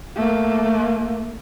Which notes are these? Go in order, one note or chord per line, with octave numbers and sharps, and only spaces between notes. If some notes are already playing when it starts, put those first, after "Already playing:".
A3 A#3